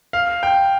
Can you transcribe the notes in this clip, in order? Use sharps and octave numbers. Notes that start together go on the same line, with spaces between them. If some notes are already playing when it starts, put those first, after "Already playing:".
F5
G5